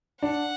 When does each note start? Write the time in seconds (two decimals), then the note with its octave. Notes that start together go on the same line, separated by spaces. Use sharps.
0.22 D4 F#5